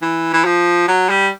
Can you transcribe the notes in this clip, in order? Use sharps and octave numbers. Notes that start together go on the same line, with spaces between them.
E3
E3
F3
F#3
G3